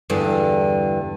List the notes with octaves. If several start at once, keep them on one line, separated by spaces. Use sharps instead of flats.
E2 G2 D3